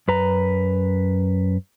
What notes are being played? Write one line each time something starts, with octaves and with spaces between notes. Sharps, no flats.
F#2 B4 A#5